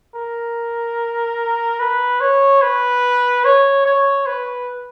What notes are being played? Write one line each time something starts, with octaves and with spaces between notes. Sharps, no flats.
A#4
B4
C#5
B4
C#5
C#5
B4